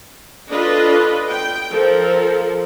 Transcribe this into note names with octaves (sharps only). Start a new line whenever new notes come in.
D4 F4 A4 B4 D#5
G5
F3 A4 A#4